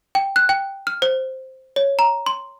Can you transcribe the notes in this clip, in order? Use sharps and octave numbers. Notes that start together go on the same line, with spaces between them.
G5
F#6
G5
F6
C5
C#5
A#5
C6